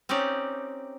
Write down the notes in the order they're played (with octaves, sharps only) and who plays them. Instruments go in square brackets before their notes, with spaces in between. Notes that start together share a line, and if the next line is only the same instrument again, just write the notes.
[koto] C4 C#4 D#4 G4 D5